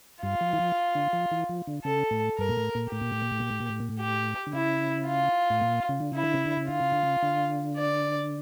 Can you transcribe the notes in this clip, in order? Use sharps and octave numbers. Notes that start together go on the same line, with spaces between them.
G2 F4
F3
E3
F3
D3
F3
E3
F3
D3
C#3 A4
A2
G2 A#4
A#2
A2
A#2
A2 G4
A#2
A2
A#2
A2
A#2
A2
A#2
A2
A#2
A2
G4
D3
C#3 E4
F4
A2
A#2
C#3
D3
C#3 E4
D3
C#3
D3
C#3
D3 F4
C#3
D3
C#3
D3
D5